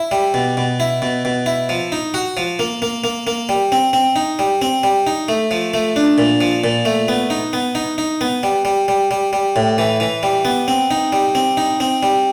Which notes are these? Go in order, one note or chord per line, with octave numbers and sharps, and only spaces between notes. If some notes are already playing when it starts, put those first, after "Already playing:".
Already playing: E4
G3
B2
B2
E4
B2
B2
E4
F3
D#4
F#4
F3
A#3
A#3
A#3
A#3
G3
C4
C4
D#4
G3
C4
G3
D#4
A3
F3
A3
D4
A#2
F3
A#2
A3
B3
D#4
B3
D#4
D#4
B3
G3
G3
G3
G3
G3
A2
E3
E3
G3
B3
C4
D#4
G3
C4
D#4
C4
G3